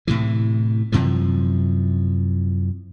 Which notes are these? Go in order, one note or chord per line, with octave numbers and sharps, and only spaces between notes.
A2 C3 E3
F#2 C3 E3 F3